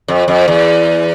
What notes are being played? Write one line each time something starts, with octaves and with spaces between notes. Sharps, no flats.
F2
F2
E2